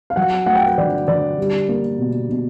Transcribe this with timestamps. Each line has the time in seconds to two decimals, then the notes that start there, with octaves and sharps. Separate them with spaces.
0.10 F5
0.16 F#3 F#5
0.46 A3 F#5
0.55 G5
0.63 F#5
0.78 D3 D5
1.08 D3 D5
1.39 G3
1.69 A#3
1.99 B2
2.29 B2